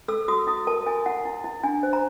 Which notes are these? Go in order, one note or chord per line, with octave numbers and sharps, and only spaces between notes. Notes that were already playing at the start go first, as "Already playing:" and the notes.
A4 E6
F#4 D#6
E4 D#6
A#4 A5
E4 G#5
E4 F#5
E4
E4
D4 G#5
C5
A#5